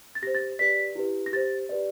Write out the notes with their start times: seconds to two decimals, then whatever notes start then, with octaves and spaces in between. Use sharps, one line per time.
0.15 A6
0.22 G4 A#6
0.27 C5
0.35 A6
0.59 G4 B4 D5 B6
0.95 E4 G4 B4
1.26 A#6
1.32 G4 C5 A6
1.69 G4 B4 D5